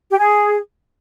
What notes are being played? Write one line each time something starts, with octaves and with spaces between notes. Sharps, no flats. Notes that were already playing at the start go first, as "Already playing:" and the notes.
G4
G#4